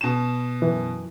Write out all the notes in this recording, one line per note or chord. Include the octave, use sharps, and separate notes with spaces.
B2 E7
F#2 E3